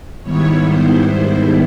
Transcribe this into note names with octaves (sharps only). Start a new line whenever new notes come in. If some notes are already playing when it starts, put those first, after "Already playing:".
G#2 D#3 G3 B3 E4 C#5
C5
C5